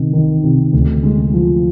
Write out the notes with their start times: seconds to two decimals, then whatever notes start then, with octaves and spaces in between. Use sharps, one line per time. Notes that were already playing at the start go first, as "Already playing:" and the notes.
Already playing: C3 D#3
0.13 D#3
0.43 C3
0.73 D2
1.03 G#3
1.34 F3